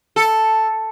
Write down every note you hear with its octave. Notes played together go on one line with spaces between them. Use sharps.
A4